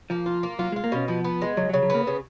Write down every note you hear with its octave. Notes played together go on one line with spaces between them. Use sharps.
F3 A#3
F4
A#3
F#3 F4
G#3
F4
A#3
B2 C#4
F3 B3
B3
G#3
C#3 F#3
F#3
C#3
F#3
A#3 B3
C#3